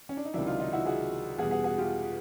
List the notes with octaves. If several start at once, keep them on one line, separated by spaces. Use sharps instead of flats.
C#4
D4
D#4
C#2 C3 D#3 F#3 D4 E4
D#4 F4
D#4 F4
E4 F#4
F#4 G#4
E2 B2 G3 F#4 G#4
F#4 G#4
F#4 G#4
F4 G4